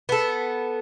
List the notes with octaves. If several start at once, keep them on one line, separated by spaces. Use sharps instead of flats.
B3 A4